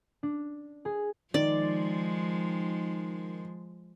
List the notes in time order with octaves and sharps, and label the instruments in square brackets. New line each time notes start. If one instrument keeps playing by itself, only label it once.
[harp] D4
G#4
[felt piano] D#3 [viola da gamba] F3 G#3 [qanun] D5